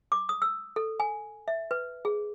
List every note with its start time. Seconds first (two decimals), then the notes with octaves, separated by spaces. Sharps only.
0.12 D6
0.29 D#6
0.42 E6
0.76 A4
1.00 G#5
1.48 E5
1.71 B4
2.05 G#4